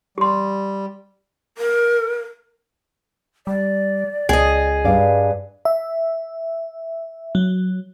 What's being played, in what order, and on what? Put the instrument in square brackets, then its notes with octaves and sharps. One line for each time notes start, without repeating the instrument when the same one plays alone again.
[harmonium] G3 [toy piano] G4 C6
[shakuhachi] A#4
[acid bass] G3 [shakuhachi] D5
[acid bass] C#2 [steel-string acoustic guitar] G#4 D#5 [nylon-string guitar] G5
[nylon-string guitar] G2 D5 F5 [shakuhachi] B4
[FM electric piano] E5
F#3